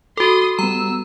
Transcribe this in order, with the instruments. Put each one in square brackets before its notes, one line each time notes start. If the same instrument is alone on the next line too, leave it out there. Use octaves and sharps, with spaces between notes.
[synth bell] F#4 A4 [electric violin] C6 D#6
[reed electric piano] G3 B3 [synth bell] A#5 [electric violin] E6